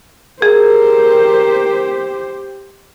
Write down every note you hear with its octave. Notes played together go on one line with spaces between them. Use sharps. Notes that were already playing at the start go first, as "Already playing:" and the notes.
G4 G#4 A#4 C5